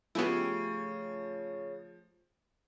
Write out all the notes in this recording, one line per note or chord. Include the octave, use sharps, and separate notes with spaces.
C#3 F3 A3 B3 E4 G4 C#5